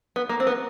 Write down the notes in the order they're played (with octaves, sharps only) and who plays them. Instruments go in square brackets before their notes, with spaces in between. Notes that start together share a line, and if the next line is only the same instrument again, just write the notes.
[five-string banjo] B3
A#3
C4
B3